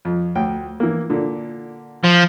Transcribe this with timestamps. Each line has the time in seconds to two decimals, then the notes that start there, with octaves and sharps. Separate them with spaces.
0.05 F2
0.35 D2 G5
0.80 E3 A#3
1.10 A#2 D3
2.04 F3